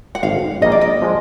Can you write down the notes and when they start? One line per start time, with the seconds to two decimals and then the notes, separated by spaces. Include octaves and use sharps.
0.15 F#5
0.23 G#1 F#2 D3 F5
0.62 A#1 A#2 G3 A#3 D#5
0.72 D5
0.81 D#5
1.02 F3 G#3